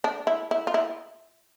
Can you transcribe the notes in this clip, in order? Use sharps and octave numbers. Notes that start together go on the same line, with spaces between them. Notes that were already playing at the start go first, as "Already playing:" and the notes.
D4
E4
E4
F4
E4